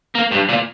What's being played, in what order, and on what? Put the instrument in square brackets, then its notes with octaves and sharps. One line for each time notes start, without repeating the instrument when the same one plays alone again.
[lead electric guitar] A#3
G2
A#2